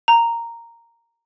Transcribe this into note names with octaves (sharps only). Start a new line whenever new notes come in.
A#5